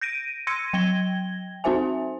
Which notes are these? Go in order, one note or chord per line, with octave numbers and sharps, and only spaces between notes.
G6 A#6 D7 D#7
C6 E6 G#6 A#6 C#7 D#7
F#3 G5 G#6 A#6 G7
C4 D#4 F#4 C5 E5 G#5